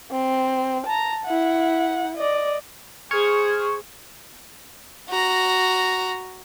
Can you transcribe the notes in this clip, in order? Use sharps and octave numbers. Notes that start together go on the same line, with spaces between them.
C4
A5 A#5
E4 F#5
D5 D#5
G#4 C5 C#6 F6 G#6
F#4 A#5